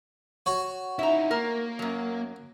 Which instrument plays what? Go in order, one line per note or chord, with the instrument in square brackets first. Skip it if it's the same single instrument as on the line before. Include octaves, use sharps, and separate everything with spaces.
[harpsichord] F#4 C#5
[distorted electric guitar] D#4 E4 [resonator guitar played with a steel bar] E5 A#5
[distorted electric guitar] A#3 [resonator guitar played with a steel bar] A#4
[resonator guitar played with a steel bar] F#2 F#3